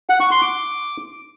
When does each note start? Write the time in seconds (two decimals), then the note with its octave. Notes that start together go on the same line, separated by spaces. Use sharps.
0.10 F#5
0.20 C#6
0.31 C6
0.42 D6